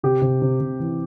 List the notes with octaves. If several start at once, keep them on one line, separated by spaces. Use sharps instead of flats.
C3 G4
C3
C3
C3
E3